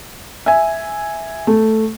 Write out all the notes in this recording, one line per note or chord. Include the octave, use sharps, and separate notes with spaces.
E5 G#5
A3